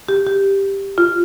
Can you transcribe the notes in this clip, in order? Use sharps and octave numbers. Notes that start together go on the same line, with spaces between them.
G4
G4
F4